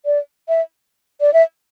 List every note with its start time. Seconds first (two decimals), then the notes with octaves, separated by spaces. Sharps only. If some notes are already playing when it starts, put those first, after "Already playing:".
0.06 D5
0.48 E5
1.21 D5
1.34 E5